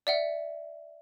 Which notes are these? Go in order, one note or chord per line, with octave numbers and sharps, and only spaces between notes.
D5 E5 F#5